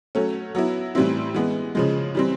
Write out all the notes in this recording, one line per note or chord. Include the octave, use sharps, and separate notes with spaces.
F#3 A3 C#4
F#3 B3 E4
A2 E3 G3 C4 E4
E3 G#3 B3
C#3 F3 G#3
E3 G3 C4